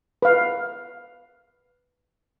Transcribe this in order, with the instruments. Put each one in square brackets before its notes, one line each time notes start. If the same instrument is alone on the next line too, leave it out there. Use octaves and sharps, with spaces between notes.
[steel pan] B4 F5